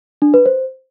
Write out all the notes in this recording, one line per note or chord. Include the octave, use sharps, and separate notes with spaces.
D4
B4
C5